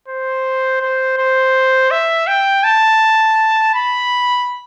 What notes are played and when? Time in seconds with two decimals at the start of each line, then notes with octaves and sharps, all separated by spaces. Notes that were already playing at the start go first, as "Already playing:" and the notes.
0.08 C5
0.82 C5
1.17 C5
1.91 E5
2.27 G5
2.64 A5
3.74 B5